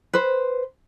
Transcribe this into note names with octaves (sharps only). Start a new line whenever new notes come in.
B4 C5